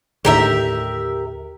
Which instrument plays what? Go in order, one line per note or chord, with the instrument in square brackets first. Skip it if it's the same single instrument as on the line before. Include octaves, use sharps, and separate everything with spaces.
[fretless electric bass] D#2 A2 D3 [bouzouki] G4 A#4 E5